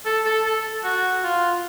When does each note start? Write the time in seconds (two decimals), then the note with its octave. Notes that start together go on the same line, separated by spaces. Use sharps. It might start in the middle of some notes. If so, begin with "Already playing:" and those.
0.06 A4
0.25 A4
0.46 A4
0.84 F#4
1.24 F4